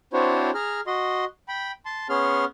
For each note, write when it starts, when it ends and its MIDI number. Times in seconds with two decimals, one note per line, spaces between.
0.13 0.51 60
0.13 0.51 62
0.13 0.51 64
0.13 0.51 66
0.13 0.51 72
0.13 0.51 73
0.55 0.81 68
0.55 0.81 82
0.55 0.81 89
0.87 1.25 66
0.87 1.25 75
0.87 1.25 84
1.48 1.72 79
1.48 1.72 83
1.85 2.07 81
1.85 2.07 84
2.10 2.45 59
2.10 2.45 61
2.10 2.45 68
2.10 2.45 84
2.10 2.45 89